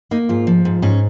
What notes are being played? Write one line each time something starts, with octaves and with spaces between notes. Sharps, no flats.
A#3 D#4
G#2 F4
F3
G#2
G#2 C#4